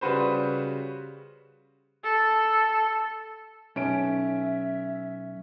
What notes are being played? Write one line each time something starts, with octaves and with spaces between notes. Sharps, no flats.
C#3 G3 F#4 B4 C5
A4
B1 C#4 E5 D7